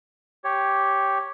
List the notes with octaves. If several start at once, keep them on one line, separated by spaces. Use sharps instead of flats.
G4 C#5